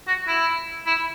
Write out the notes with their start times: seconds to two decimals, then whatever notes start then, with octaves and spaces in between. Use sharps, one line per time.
0.07 F#4
0.27 E4
0.86 E4